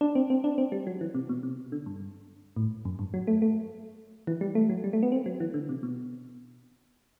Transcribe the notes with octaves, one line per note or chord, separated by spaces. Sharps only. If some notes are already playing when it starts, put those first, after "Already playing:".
D4
C4
C4
D4
C4
G3
F#3
E3
C3
B2
C3
D3
G2
A2
F#2
G2
F#3
A3
A3
E3
G3
A3
F#3
G3
A3
B3
C4
F#3
E3
D3
C3
B2